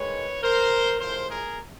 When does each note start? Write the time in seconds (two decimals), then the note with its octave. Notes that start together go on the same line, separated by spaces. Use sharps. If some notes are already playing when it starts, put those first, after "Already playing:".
Already playing: G#2 D#3 G#3 B4 C#5
0.43 A#4 C5
1.00 A2 F3 G#3 A#4 C5
1.29 G#4 A#4